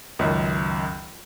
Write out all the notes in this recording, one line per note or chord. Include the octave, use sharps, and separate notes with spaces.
C#2 F#2 D#3